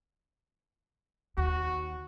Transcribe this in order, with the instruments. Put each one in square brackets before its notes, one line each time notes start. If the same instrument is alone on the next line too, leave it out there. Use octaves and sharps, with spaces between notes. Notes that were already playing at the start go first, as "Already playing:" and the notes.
[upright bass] D#2 [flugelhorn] F#4